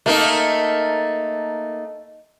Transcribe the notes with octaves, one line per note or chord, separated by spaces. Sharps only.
A3 A#3 D#4